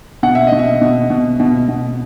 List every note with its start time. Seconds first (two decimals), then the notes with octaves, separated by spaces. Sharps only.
0.23 B2 F#5
0.35 E5
0.47 D#5
0.52 B2
0.59 E5
0.81 B2
1.10 B2
1.40 B2
1.69 B2